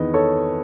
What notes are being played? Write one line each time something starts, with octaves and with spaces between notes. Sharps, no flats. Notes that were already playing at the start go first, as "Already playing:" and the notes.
Already playing: E2 D#3 B4 D#5
A4 C#5